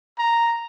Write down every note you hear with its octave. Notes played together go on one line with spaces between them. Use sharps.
A#5